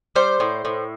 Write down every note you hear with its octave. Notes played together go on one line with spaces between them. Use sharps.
G3 C5
A2
A2